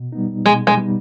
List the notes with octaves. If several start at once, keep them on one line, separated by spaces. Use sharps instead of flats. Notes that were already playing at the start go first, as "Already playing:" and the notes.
Already playing: B2
G3 B3 D#4
B2 G#3
G#3
G3 B3 D#4